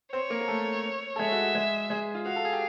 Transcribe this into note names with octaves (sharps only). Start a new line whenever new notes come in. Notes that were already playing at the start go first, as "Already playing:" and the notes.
C4 C5 C#5
A#3 A#4
A#4
A3 A4
A4
G#3 G#4 E5
F#4
F#4
G#3 G#4
G#3 G#4
F4
F#4 F5
A4
G#4
G4